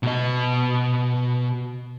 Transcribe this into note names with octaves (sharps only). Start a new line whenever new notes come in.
B2 D#5